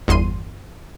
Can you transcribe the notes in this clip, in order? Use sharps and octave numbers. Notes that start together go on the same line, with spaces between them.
G1 E2 C6 D#7